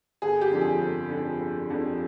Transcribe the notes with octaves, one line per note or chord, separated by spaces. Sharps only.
G1 G#4
G4
F2 D3 F3
G#4
G1
F2 D3 F3
G1
F2 D3 F3